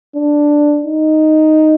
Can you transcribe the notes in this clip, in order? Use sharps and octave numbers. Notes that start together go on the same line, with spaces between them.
D4
D#4